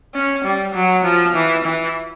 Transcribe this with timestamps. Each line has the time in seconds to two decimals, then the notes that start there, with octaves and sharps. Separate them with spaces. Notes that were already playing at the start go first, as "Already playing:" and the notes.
0.14 C#4
0.44 G3
0.74 F#3
1.05 F3
1.35 E3
1.65 E3